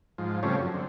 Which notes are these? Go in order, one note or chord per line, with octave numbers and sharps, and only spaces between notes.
G#2 F3
C#3 F3 G3 A3 C4 C#4
F#2
D3 C4